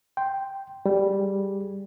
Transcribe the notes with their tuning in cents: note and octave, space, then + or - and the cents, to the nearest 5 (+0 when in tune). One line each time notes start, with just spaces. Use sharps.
G5 +0 C6 +0
G3 +0 G#4 +0